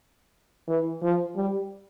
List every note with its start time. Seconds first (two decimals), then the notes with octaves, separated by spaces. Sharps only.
0.68 E3
1.03 F3
1.36 G3